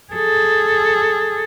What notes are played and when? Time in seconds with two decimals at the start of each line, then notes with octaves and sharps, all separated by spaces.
0.14 G#4 A4